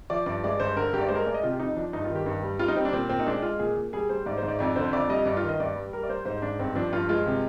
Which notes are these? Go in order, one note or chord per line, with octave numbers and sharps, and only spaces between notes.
F3 D5
G2 D5
G#3 D5
G2 C5
D3 A#4
G2 G4
D5
G#3 C5
A#4
G#3 D5
D#5
C3 F4
G4
F2 D#4
F3 D4
G2 D#4
F4
D#3
G4
G2
G3
G3 F4
D#4
G3 C4
D4
A#2 C4
A#2 C4
D#4
G#3 D4
G#3 F4
A#2 G#4
A#2
G3 G#4
G3 C5
G#2 D5
C5
G#2
D5
F2 D5
D3 C5
F2 D5
G3 D#5
G2 D5
F4
D#3
D#5
G2 D5
G3
G3 A#4
D5
G3 C5
G#2 C5
G#2 D4
G2 C4
F3 D4
G2 F4
G#3 F4
C3